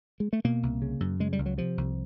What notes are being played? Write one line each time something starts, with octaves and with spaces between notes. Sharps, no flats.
G#3
A3
B2 A#3
C2
C#3
F#2
C#3 G#3
G3
C#2
F#3
C3 F3
C2